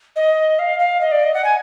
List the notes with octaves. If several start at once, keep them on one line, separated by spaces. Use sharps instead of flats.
D#5
F5
F5
D#5
D5
D#5
F#5
G#5